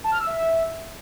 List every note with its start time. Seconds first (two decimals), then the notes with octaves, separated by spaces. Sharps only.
0.04 A5
0.12 F6
0.19 E6
0.27 E5